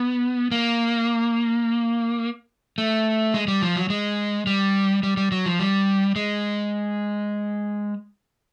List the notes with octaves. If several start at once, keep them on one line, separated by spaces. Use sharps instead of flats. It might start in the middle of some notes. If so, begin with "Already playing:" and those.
Already playing: B3
A#3
A3
G#3
G3
F3
F#3
G#3
G3
G3
G3
F#3
F3
G3
G#3